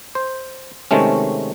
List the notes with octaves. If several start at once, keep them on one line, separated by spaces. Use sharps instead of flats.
C5
C3 D#3 G#3 A3 C#4